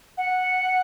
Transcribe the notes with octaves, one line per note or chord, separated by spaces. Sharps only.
F#5